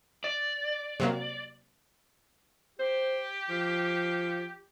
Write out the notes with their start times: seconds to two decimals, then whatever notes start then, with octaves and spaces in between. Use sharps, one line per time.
0.24 D5
1.00 C3 F#3 A#3
2.79 G4 C5
3.49 F3